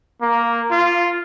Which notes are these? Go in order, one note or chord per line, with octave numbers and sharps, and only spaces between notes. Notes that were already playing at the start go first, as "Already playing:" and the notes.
A#3
F4